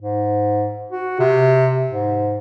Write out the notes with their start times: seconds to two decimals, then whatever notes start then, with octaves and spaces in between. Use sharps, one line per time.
0.01 G#2
0.91 F#4
1.19 C3
1.90 G#2